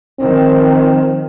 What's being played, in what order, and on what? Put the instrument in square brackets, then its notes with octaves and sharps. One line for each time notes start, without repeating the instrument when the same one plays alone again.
[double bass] D#3 F3 [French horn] C4